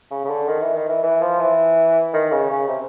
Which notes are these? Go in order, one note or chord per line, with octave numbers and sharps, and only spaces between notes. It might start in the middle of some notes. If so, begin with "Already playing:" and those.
C#3
C#3
D3
D#3
E3
D#3
E3
E3
F3
E3
D#3
C#3
C#3
C3